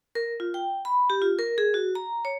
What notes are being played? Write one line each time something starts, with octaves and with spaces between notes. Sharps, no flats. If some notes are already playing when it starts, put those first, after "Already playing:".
A#4
F4
G5
B5
G4
F4
A#4
G#4
F#4
A#5
C#5